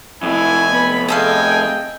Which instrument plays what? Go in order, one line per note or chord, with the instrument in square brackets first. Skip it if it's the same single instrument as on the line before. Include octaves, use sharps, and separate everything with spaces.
[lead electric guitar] F2 C3 [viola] E4 [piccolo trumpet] G#5
[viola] B3 B5
[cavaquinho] G#4 A4 F5 [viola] D#5 G5 [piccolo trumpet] G#5